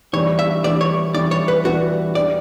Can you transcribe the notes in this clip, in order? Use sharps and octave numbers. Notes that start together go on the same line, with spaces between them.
E3 G3 D4 C#5
E5
E3 G3 D4 D5
C#5
E3 G3 D4 D5
C#5
B4
E3 G3 D4 F#4
G3 D4 G4 D5